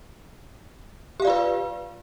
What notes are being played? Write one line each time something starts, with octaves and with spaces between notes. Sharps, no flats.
F4 G4 B4 D5 F5